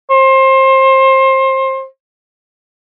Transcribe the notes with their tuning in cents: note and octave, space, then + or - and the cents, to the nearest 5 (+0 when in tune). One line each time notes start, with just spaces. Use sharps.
C5 +25